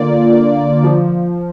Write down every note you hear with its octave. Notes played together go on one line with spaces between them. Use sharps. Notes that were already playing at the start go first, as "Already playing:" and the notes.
Already playing: D3 A#3 F4 D5
F3